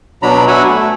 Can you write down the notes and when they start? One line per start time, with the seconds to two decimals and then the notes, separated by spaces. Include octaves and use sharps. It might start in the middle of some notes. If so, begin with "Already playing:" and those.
0.23 B2 F#3 D4 A#5 B5
0.48 F#4 E5 F#5 G#5 B5
0.69 A3